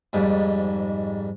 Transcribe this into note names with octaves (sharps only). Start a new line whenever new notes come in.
F2 G#2 G3